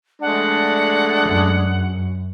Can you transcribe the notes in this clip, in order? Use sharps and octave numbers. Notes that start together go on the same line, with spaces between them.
G#3 A3 D4 F#5
F#2